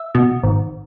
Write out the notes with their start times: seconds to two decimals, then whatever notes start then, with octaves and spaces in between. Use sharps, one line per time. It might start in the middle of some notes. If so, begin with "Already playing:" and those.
Already playing: E5
0.15 B2
0.44 G#1